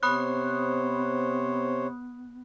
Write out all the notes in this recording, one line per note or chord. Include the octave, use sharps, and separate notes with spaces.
C3 B3 C5 C#5 B5 D#6 F#6